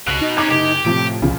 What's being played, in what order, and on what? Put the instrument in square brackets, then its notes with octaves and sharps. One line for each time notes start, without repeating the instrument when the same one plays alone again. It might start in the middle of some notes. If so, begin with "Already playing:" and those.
[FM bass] C#2 [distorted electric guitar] B2 [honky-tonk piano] F#6
[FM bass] D#4
[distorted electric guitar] C3 C#4 [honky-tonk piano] D6 G#6
[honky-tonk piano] F#1 [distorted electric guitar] G4
[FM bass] A2 [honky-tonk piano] C3 F3 D7
[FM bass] C2 [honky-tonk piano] A#2 C#3 F3